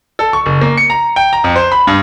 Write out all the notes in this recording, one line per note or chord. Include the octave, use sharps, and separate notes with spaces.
A4
C#6
F#1
A#3
C#7
A#5
G5
A#5
F2
C5
B5
G2